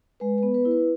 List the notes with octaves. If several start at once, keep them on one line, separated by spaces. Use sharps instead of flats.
G#3 B4
B3 B4
B4
E4
B4